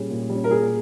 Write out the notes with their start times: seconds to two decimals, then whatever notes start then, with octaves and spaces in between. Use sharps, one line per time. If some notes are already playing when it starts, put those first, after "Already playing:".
Already playing: A#2 G3 C#4 G#4
0.10 A#2
0.30 G3
0.35 C#4
0.44 A#4
0.50 A#2 G#4